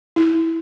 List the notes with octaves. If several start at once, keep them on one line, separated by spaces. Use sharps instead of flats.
E4